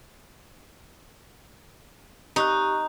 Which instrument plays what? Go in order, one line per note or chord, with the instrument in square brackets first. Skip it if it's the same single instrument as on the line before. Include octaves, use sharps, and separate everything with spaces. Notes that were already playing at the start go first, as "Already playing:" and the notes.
[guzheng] D#4 [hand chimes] G4 C#6 F#6